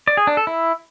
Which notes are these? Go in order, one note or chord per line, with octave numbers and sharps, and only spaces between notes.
D5
G#4
D4
A4
E4